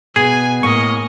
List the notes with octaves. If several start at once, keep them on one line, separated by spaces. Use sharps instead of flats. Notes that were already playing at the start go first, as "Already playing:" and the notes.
B2 G#4 G#5
A2 A#3 D#5 G#5 C#6